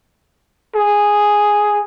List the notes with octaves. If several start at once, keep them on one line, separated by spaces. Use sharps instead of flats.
G#4